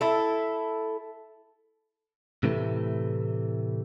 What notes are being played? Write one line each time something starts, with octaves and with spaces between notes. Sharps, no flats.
E4 A4
A2 C3 E3 A3